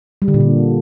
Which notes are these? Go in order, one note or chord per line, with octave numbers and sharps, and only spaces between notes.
G3
D3
A#2
D3